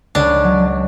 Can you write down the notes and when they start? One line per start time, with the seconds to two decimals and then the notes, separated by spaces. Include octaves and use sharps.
0.15 C#2 D4
0.44 F#3